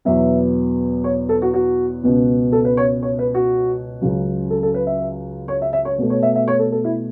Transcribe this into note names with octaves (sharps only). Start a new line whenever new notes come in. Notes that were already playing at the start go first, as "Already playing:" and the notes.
E2 B2 F#3 B3 E5
C#5
A4
F#4
F#4
C#2 B2 B3
A4
B4
C#5
C#5
B4
F#4
C#2 C#3 F#3
A4
A4
B4
E5
C#5
E5
E5
C#5
B2 A3
C#5
E5
E5
C#5
A4
A4
E4